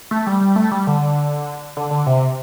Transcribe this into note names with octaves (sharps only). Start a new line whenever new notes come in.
A3
G3
G3
A3
G3
D3
D3
D3
C3